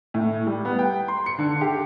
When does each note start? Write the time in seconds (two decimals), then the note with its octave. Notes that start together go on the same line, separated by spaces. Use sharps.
0.14 A2
0.47 G3
0.65 B3
0.79 G5
1.08 C6
1.26 C#7
1.38 D3
1.61 G4